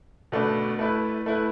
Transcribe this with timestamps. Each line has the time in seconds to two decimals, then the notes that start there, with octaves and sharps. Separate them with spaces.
0.32 B2 A3 D4 B4
0.79 A3 E4 B4
1.26 A3 E4 B4